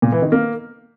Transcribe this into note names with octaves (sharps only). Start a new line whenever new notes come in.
A#2
E3
D#3
A#3